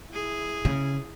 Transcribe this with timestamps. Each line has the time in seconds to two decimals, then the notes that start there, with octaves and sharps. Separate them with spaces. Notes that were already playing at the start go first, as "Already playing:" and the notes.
0.10 E4 G#4
0.65 C#3